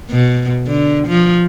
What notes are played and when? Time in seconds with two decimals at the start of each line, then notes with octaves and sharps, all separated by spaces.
0.11 B2
0.67 D3
1.08 F3